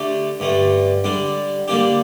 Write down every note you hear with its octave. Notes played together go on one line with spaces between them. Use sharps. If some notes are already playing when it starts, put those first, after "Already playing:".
Already playing: D3 A3 D4 G4
G2 D3 A3
D3 G3 D4
D3 G3 A#3 D4 G4